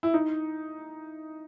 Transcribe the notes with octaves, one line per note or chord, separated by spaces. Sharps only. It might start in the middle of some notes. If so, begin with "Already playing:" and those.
E4
D#4